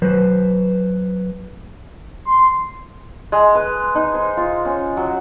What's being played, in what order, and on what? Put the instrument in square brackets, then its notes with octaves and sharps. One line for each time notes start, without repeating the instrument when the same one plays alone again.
[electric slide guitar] F#3 B4 C5
[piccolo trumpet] C6
[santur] G#3
B4
D#4
C5
F4
C#4
F#3